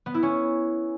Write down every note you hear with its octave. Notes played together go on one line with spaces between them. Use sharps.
B3
E4
C#4